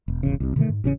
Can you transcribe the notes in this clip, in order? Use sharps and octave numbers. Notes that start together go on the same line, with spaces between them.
E1
E1 A1 C#3
C2 C3
B2 D3 D#3 A3
G#2
A1 C#3 C#4